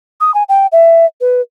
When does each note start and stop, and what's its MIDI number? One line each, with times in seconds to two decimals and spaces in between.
0.21 0.34 87
0.34 0.43 80
0.49 0.67 79
0.72 1.06 76
1.21 1.41 71